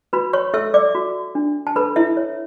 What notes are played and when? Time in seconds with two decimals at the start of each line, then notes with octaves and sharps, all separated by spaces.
0.13 F#4 B4 B5
0.33 C#5 C#6
0.54 A4 E5 E6
0.74 D5 D6
0.95 F#4
1.35 D4
1.67 A5
1.76 A4 B4 B5
1.96 E4 E5
2.17 C#5